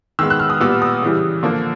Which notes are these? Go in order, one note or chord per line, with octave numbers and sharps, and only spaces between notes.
D#3 G#3 B3 E6
F#6
F6
D#6
A#2 G3 B3 E6
D#6
C#3 E3 G3
D3 F3 A#3